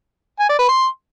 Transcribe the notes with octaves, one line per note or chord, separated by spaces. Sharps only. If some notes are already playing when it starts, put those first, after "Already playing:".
G#5
D5
B4
C6